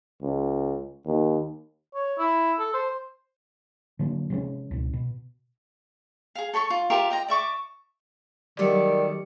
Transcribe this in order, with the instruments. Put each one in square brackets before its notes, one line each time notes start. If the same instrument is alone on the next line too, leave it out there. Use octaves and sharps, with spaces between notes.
[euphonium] C#2
D#2
[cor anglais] C#5
E4
A4
C5
[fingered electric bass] D3 F#3 A#3
C3 F3 G#3 C#4
C#2 B2
B2
[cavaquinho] G#4 F5
A4 C#5 B5 C#6
F4
F4 G4 A#4 E5
D#5 G5 A#5
D5 E5 C#6 D6
[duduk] D#3 [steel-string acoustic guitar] F#3 G3 A3 [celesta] G4 C#7 [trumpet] D5